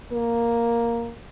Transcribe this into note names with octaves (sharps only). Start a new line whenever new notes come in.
A#3